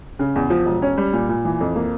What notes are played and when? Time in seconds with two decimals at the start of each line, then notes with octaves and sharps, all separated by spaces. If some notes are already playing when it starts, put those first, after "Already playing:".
0.19 C#3
0.35 E2
0.50 F3
0.66 E1
0.82 C#4
0.98 G3
1.13 A#2
1.29 A#2
1.45 E3
1.60 F2
1.76 A#3